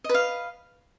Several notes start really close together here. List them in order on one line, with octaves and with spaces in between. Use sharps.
D#5 B4 F5